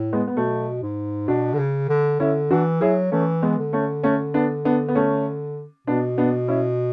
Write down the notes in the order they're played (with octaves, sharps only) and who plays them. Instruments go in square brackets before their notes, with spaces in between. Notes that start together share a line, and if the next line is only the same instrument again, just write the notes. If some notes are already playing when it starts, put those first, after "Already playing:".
Already playing: [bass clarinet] A2
[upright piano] G#3 B3
B3
[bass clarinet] B2 [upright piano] F#3 A3
[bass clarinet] G#2
[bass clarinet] B2 [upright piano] D4 F#4
[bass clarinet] D3
C#3
D3
[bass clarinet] D3 [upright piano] C#4 E4
[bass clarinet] E3 [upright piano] D4 F#4
[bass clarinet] F#3 [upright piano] E4 G#4
[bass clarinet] E3 [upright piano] A3 C#4
[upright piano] G#3 B3
[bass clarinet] D3
[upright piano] A3 C#4
A3 C#4
B3 D4
B3 D4
B3
A3 C#4
[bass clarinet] B2 [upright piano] B3 D4
[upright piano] B3 D4
C#4 E4